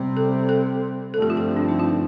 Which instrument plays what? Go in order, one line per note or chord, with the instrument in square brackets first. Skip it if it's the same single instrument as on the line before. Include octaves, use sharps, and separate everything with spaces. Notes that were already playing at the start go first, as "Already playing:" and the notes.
Already playing: [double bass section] C3 G3 C4
[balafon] A4
A4
[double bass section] G2 D3 F3 A3 C4 [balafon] A4
[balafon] G4
F4
G4
D4
D#4
F4